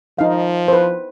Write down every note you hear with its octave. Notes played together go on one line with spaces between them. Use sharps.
F3 D#4 F5
B4 C5